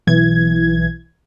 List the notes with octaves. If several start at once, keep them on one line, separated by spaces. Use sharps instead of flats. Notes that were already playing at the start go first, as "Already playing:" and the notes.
B1 E3 G#6